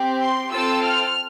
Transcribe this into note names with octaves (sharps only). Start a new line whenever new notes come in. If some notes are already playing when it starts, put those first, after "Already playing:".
Already playing: C4 G4
C6
C4 F4 A4 E6
F6